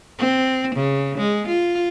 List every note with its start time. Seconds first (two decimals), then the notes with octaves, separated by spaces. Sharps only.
0.19 C4
0.75 C#3
1.18 G#3
1.47 F4